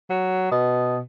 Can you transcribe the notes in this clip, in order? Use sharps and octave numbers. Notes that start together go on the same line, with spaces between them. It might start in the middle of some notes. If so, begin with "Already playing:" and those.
F#3
B2